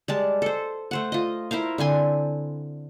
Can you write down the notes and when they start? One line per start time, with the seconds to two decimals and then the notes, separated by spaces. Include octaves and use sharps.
0.08 G3 G#3 A5
0.42 A4 C5
0.91 A3 C5 F#5
1.12 F4 D#5
1.51 E4 A#4 C5 F5
1.78 D3 C4 G#5 C6